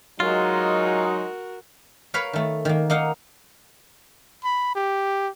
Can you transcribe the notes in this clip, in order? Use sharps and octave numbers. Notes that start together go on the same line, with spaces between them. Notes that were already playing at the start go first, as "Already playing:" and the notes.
F#3 G#3 D#4 F4 F#4 A#4 D#5
A#4 B4 C#5 F5 B5
D#3 A3
D#3 A#3
A#3 D#4 F5 F#5
B5
G4